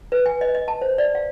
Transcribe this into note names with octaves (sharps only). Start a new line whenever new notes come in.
B4
G#5
D#5
D#5
A5
C5
D5
F5